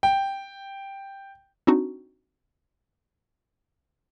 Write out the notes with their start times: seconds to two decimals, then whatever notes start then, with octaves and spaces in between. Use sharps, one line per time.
0.03 G5
1.67 C4 D4 D#4 F#4